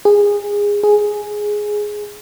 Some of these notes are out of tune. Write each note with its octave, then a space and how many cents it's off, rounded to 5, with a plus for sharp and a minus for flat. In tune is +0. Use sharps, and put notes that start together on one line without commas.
G#4 -20
G#4 +5